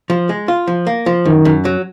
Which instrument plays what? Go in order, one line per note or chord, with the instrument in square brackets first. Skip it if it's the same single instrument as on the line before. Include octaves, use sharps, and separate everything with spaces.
[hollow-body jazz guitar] F3
G#3
F4
F3
A#3
F3
[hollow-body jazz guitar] F#2 [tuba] D#3
[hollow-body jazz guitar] F#2
F#3